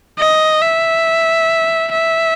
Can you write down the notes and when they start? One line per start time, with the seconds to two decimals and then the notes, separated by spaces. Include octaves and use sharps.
0.19 D#5
0.62 E5
1.92 E5